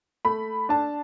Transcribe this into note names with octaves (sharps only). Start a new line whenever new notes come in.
A3 B5
D4 A5